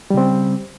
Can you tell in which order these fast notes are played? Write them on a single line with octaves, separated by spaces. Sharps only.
G3 C#3 C4